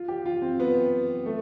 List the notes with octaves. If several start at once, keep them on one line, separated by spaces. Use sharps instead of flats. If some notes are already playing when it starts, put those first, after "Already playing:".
Already playing: F4
G4
F4
C4
B3
A3